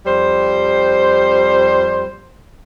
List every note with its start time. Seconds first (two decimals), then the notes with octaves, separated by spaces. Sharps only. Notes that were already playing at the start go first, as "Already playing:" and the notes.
0.05 F2 G3 C5